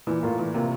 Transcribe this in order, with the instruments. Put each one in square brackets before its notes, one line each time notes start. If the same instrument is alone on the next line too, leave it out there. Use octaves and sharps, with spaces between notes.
[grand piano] A#2 [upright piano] E3
[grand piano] A2 [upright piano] A#3 F4
[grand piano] A#2 [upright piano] E3
[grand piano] C3 [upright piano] A#3 F4